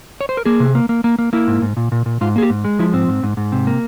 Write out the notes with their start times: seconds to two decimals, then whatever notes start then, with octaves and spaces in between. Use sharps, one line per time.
0.21 C#5
0.29 C5
0.37 A#4
0.46 A#3 G#4
0.60 C3
0.75 A#3
0.89 A#3
1.04 A#3
1.19 A#3
1.33 A#3 E4
1.48 G#2
1.62 G#2
1.77 A#2
1.92 A#2
2.06 A#2
2.21 G#2 F4
2.36 A#3 G#4
2.43 G4
2.50 G#2
2.64 G#3
2.79 F3 E4
2.93 G#2 C4
3.08 G#2
3.23 G#2
3.37 G#2
3.52 C3
3.67 A#3